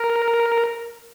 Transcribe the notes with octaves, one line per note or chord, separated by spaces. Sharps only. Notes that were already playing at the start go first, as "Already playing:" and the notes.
Already playing: A#4